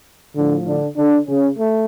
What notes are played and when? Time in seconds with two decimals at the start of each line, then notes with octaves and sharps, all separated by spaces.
0.35 A2 D3 F3 D4
0.66 D3 D4
0.97 D3 D4
1.27 C#3 C#4
1.57 A3